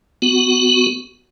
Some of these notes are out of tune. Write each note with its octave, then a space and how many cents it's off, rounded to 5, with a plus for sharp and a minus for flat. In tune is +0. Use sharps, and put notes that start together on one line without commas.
B3 +25 F#4 +0